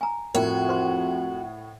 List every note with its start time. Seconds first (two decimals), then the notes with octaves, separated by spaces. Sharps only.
0.01 G#5 A#5
0.35 F2 A2 F#4 A#4
0.69 C5 C6